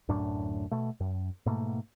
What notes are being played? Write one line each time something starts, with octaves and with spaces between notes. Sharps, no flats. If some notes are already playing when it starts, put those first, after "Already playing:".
D1 F#2 A2 D4
B2 A3
F#2
G#2 B2 A3 A#3